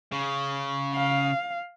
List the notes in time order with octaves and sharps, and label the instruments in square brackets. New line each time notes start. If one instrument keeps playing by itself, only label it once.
[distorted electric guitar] C#3
[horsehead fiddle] F5